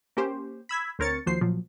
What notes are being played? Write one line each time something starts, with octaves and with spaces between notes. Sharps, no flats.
A#3 C#4 G4 C5
B5 E6 G#6 B6
D2 C4 A#4 C#5 A6 C#7
D#2 F3 F#3 C5 C7
A#2 F3 F#3